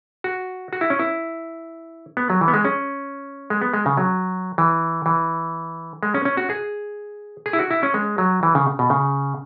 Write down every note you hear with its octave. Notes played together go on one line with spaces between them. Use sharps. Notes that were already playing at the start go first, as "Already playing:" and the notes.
F#4
F#4
E4
C#4
E4
B3
F#3
E3
B3
G#3
C#4
G#3
B3
G#3
C#3
F#3
E3
E3
G#3
C#4
C#4
F#4
G#4
G#4
E4
F#4
E4
C#4
G#3
F#3
E3
C#3
B2
C#3